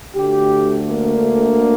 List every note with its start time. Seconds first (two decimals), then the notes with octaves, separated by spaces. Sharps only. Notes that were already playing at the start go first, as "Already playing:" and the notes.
0.15 D2 D3 A3 G4
0.88 A#3